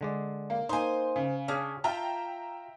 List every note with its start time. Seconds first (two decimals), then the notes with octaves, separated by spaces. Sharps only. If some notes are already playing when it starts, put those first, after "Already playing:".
0.01 D3 G#3 D5
0.50 A#3
0.69 A#3 D#4 C5 G#5 C6
1.16 C#3
1.48 C#4 D4 G#4 D5
1.84 F4 E5 G5 A5 A#5